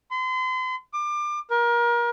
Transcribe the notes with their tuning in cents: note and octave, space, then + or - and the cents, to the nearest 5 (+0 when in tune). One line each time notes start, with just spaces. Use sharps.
C6 -40
D6 +30
A#4 +30